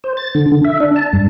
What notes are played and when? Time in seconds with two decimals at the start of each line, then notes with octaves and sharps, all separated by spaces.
0.04 C5
0.17 A6
0.35 D3
0.52 D3
0.65 E5
0.80 D4
0.96 A5
1.13 G2